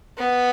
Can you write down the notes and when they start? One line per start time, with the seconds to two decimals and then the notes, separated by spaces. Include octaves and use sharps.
0.18 B3